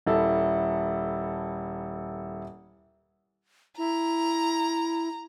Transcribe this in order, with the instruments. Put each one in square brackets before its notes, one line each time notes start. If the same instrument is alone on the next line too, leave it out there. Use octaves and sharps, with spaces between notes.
[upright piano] D#1 E4 A4
[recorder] E4 [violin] A#5